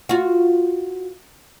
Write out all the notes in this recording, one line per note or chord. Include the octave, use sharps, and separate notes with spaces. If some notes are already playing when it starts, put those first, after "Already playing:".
F4 F#4